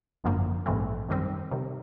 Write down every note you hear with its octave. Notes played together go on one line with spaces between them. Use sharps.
G#1 F#2 D3 F3 A#3
A#1 G#2 E3 A3 C4
F#2 D#3 G3 C4
C3 D#3 G3